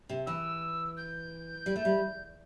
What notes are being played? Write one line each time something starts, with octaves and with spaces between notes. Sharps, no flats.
C3
E3 E6
G6
G3
A3
G3